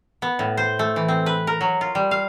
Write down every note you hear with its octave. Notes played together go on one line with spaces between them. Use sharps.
B3
A2
C5
A3
E3
C4
B4
A#4
F#3
F4
G3
F5